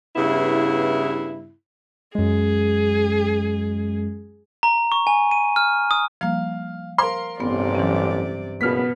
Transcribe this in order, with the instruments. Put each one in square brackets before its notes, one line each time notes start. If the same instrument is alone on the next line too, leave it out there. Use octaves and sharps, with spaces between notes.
[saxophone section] G2 C#3 B3 E4
[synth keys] F#2 G#3 [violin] G#4
[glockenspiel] A#5
C#6
G#5
D#7
F6
D#6
[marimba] F3 G3 A#3 [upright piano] F5
[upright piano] A#4 F5 C6 [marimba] C5
[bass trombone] A1 [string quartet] G2 C3 D5 [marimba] B3
[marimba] E3 F#3 C#4
[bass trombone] F#1 [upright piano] B2 F6 B6 [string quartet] B3